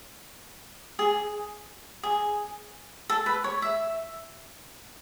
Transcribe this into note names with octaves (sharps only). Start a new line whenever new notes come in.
G#4
G#4
A4
B4
C#5
E5